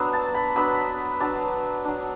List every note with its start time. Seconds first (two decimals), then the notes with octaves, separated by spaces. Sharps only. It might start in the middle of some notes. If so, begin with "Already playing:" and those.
Already playing: F#3 B3 D4
0.13 A5
0.34 B5
0.56 F#3 B3 D4 B5
1.20 F#3 D4 A5
1.85 F#3 D4